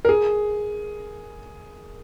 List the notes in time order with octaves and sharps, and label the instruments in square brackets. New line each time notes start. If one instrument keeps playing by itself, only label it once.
[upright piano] A#4
G#4